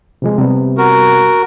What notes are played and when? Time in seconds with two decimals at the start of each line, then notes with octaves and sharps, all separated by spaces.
0.22 C3 F3 G#3
0.38 C3 G3 B3
0.78 F#4 A#4